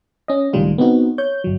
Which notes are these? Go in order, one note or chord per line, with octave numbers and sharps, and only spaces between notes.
C#4 D#5
C#2 A2 D#3 G3 F4
B3 C4 D#4 F#4
C#5 G6
G1 F#3